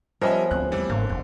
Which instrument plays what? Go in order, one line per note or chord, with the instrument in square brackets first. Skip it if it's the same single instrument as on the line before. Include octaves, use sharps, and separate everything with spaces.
[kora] F3 B3 C#4 [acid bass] G3 [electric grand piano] A#4 D#5 E5
[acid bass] D2 [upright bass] G#3 C4 [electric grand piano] F#6
[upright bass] D#2 A3 [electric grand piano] E3 G3 C4
[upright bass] G#1 [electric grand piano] D3 [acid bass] A#3
[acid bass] F#1 [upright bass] E2